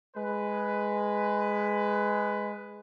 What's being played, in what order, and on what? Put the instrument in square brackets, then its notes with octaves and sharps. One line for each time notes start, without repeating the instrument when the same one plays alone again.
[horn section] G#3 B4